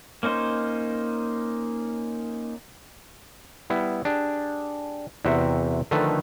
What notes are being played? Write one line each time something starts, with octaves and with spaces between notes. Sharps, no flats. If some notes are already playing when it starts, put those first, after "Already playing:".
A#3 C#4 D#4 C5
G3 B3 E4
D4 G4 G#4
E2 C3 F#4 E5 G5
D3 D#3 F3 A3 A4 B4